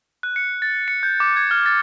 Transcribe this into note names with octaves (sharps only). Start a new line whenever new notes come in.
F#6
C#7
A6
C#7
G6
D6
G#6
F6
A6